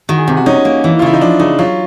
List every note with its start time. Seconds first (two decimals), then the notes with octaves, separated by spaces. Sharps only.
0.09 D#3 F#4
0.18 G#4
0.27 C3 G4
0.37 F#4
0.46 C#4 D#4
0.65 A#3
0.84 E3
0.99 F4
1.02 C#3 E4
1.13 D#4
1.21 F3 D4
1.40 C#3 D#4
1.59 F#3 F4